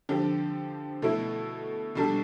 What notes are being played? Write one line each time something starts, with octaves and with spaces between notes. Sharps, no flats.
D3 F3 C4 G4
B2 A3 E4
B2 G3 D4 A4